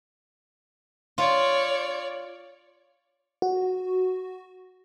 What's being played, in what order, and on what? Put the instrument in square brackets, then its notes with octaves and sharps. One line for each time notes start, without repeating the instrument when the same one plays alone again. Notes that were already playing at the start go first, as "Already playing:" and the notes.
[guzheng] F4 [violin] C#5 D5
[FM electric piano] F#4